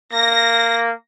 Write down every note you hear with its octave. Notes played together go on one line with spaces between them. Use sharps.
A#3 A#6